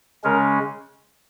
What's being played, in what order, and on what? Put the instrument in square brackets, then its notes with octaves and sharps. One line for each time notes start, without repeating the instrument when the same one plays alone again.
[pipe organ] C#3 G#3 C#4 A#4